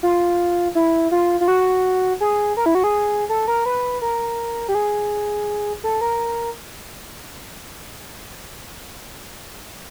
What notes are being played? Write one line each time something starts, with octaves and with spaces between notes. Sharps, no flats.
F4
E4
F4
F4
F#4
G#4
A#4
E4
F#4
G#4
A4
A#4
B4
A#4
G4
G#4
A4
A#4